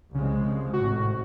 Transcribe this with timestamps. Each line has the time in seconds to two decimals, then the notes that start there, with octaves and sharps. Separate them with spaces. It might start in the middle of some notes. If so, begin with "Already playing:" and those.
0.15 C2 C#3 F3 G#3
0.73 G#1 A2 C3 F#4